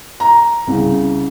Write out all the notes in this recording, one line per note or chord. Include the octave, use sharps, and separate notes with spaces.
A#5
C2 C#3